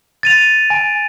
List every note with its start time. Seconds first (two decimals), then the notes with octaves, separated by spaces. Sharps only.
0.23 A6 D#7 F7
0.70 G#5